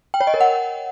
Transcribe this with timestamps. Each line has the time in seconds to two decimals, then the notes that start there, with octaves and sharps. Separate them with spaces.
0.14 G5
0.21 C#5
0.27 D#5
0.34 A#4
0.40 F#5